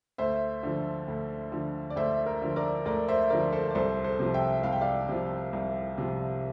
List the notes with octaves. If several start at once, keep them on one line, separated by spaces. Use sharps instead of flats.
D2 C5 E5
D3 F3
D2
D3 F3
D5
D2 C5 E5
A#4
D3 F3
A#4 D5
D2 A#4 D5
C5 E5
D3 F3 A#4 D5
A4 C5
D5
C2 A4 C5
A4 C5
C3 F3
E5 G5
C2 F5
G5
D5 F5
C3 F3
C2
C3 F3